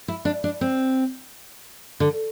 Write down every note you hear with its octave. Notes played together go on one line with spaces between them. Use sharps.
E4
D4
D4
C4
D3